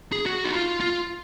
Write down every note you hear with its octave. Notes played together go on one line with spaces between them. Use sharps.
G#4
F#4
D#4
F4
F4